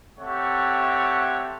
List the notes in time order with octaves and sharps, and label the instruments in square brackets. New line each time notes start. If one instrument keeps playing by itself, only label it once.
[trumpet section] A3 C4 G4 C#5 F#5